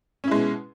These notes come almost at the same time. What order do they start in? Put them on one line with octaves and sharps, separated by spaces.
C#4 E4 G#3 B2